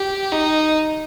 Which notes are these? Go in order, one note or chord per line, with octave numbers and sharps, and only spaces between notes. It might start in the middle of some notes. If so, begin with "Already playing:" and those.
Already playing: G4
D#4